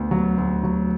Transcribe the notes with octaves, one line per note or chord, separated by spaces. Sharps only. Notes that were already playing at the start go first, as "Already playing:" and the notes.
Already playing: D2 B3
F#3
D2
F#3